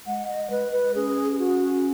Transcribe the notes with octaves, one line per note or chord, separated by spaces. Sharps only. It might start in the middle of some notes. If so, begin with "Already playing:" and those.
G#3 F#5
D#5
G#3 B4
B4
C#4 G#4
G#4
F#4